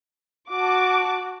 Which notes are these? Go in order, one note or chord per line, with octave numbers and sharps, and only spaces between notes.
F#4 A5 D6